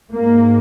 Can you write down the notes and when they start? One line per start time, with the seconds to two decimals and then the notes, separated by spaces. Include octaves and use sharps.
0.14 G#2 A#3